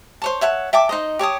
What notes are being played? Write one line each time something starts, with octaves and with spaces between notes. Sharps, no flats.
C5 C#5 A5
C#5 E5 F#5 A5
E5 G5 A5 D6
D#4 C5 D#5
G4 C#5 A5 D#6